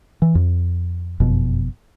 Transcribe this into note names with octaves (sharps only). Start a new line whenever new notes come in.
E3
F2
F#1 F2 B2